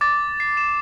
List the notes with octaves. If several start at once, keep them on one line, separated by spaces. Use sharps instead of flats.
D6 A6
C7
E7